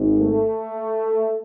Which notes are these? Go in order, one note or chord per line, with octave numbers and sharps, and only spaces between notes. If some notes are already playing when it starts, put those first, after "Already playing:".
Already playing: G#1 G#2
A3